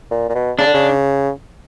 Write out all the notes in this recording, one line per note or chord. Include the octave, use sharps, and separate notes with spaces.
A#2
A#2
B2
C#3 D4
D3
C#3